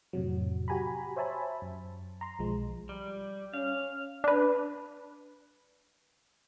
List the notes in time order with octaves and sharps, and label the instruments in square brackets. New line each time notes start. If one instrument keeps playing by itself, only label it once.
[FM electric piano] F2 A2 C3 F#3
F#4 G4 G#5 A#5 B5
C5 C#5 E5 G#5 A5 B5
F#2
A#5 C6
B1 F3 G#3
[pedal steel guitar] G3
[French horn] C#4 [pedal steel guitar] F5
[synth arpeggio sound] D4 B4